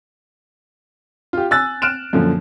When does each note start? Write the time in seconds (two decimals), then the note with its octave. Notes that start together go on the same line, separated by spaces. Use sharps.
1.33 F4 G4
1.51 G#5 E6 F#6 A6
1.82 F6 F#6 D7 E7
2.13 F#2 A#2 D3 F3